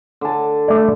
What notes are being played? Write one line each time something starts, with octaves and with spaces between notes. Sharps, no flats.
D3 A5
A3 D5